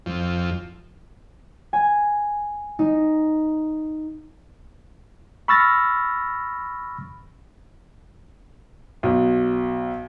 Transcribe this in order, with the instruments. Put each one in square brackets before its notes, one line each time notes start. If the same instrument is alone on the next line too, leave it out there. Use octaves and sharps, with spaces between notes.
[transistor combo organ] F2
[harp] G#5
D#4
[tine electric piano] B5 C#6 E6 F6 A6 A#6
[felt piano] B1